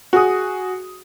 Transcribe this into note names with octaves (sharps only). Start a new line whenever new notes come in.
F#4 G#4 D#6